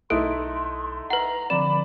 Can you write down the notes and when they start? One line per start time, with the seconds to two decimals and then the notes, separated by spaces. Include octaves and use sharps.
0.10 B1 A3 D#4 E4 C6 D#6 F#6 D7
1.10 B4 F#5 A#5
1.50 D3 F3 C4 D5 B5 E7